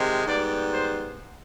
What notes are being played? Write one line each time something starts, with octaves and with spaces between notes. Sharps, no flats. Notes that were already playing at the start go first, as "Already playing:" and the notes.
Already playing: C3 D#3 G#3
G#2 G3 B3 D5
C5